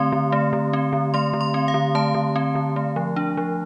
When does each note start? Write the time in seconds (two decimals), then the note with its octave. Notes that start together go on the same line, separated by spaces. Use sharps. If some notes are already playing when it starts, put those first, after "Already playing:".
Already playing: D3 A3 C4 C6
0.12 D3
0.32 A3
0.53 D3
0.73 C4
0.93 D3
1.14 A3 C6
1.33 D3
1.41 C6
1.54 C4
1.68 F5
1.74 D3
1.95 A3 A5
2.15 D3
2.36 C4
2.55 D3
2.76 A3
2.96 F3
3.16 D4
3.37 F3